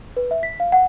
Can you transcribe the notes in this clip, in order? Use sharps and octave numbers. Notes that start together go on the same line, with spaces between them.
B4
E5
B6
F5
F#5